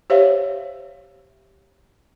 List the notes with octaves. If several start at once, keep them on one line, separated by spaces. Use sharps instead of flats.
G4 C5 C#5 E5 F5